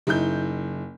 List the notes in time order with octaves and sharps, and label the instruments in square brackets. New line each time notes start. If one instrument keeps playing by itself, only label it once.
[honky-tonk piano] F#1 D#4 E4 G6